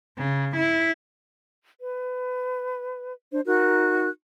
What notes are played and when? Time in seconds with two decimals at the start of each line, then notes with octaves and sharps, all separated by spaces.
0.17 C#3
0.57 E4
1.79 B4
3.32 D4 C5
3.46 D#4 F#4 A#4 F#6